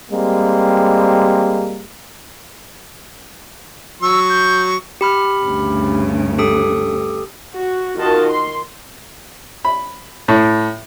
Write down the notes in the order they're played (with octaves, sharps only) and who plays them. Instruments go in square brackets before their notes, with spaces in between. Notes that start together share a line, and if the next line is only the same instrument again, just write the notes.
[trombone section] G3 G#3 A#3 C4
[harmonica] F#3 C#6 [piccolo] E6
[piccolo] G6
[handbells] G4 B5 F6
[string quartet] D2 G2 C#3
[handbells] G4 A4 D#6
[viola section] F#4
D#3 F4 F#4 A#4 D#5 A5
C6
[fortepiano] B5
A2